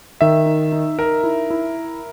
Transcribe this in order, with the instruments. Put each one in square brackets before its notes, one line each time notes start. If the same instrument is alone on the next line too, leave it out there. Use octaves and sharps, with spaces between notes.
[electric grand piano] D#3 [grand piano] E5
[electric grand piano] D#4
D#4
[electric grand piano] D#4 [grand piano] A#4
[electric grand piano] E4
E4